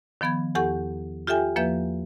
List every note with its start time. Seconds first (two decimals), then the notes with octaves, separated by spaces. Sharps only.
0.21 D#3 F3 B3 B5 G#6
0.55 E2 G4 A4 F#5 C#6 G6
1.27 F4 G4 A4 E5 G5 G#5
1.56 E2 F3 A#3 B4 E5 G6